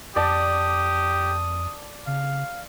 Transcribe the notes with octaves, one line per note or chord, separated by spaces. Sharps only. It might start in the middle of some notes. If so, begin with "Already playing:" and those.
F2 G4 D5 A5 D#6
C#3 F5